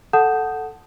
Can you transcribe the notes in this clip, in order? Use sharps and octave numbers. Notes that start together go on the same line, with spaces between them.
A4 F#5 A5 D#6 G6 E7